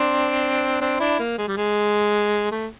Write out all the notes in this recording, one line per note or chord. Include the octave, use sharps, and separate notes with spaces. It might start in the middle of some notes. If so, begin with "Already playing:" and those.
Already playing: C4 D4
C4 D4
D4 E4
A#3
G#3
G3
G#3
A3